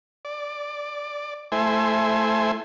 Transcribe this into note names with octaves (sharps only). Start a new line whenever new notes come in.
D5
A3 E4 C5 G#5